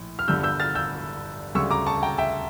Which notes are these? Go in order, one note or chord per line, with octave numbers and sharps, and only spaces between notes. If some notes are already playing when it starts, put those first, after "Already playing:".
Already playing: A#1 A2
F6
G1 G2 D3 G3 E6 G6
E6 G6
F6 A6
E6 G6
D2 C#3 G3 C#6 E6
A#5 D6
A5 C#6
G5 A#5
E5 G5